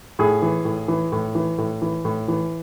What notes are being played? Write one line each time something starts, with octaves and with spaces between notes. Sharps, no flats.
A2 G#4
E3
A2
E3
A2
E3
A2
E3
A2
E3